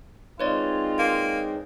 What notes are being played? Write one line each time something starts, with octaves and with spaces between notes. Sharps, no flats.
G#3 C4 D#4 F4 B4 C#5 D5
A#3